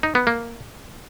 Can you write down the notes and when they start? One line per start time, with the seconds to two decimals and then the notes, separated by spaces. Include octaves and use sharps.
0.03 D#4
0.15 B3
0.27 A#3